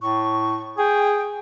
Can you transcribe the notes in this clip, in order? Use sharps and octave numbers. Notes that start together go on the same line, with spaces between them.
A2 C#6
G#4 G5